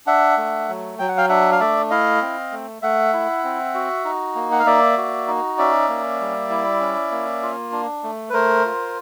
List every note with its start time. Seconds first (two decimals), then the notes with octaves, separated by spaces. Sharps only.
0.06 D4 E5 F#5
0.37 A3
0.68 F#3
0.99 F#3 G5
1.09 F#5
1.17 F5 G5
1.29 D4 E5 F#5
1.52 F5
1.60 A3 D5 E5
1.90 E4 D#5 F5
2.21 C4
2.52 A3
2.82 A3 E5 F#5
3.13 E4
3.44 C4
3.74 F#4
4.05 D#4
4.35 A#3
4.52 F#5
4.59 F5
4.66 A#3 D5 E5
4.97 F#4
5.27 D#4
5.58 C#4 D5 E5
5.88 A#3
6.20 G3
6.50 E4
6.80 C#4
7.11 A#3
7.43 F4
7.72 D4
8.03 A3
8.30 B4
8.33 A3 A#4 C5
8.65 F4